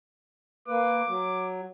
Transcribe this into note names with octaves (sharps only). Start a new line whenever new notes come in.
A#3 B4 D6
F#3